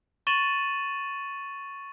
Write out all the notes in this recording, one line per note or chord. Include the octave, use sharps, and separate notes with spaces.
C#6 A6 D#7 E7 F#7